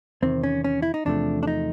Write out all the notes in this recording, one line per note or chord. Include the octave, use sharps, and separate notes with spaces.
E2 C3 D#3 C4
C#4
C#4
E4
D#4
E2 C3 F3 A3 D4
D4
D#4